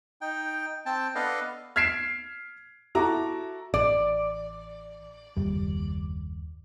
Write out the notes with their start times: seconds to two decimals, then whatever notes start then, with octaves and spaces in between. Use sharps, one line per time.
0.21 D#4 G5
0.86 C4 G5 A5
1.15 B3 D4 A4 B4 D#5 F5
1.76 F6 G#6 B6 C7 D7 E7
2.95 E4 F#4 A4 A#5 D6
3.74 A1 D5
5.37 F#1 D#2 G3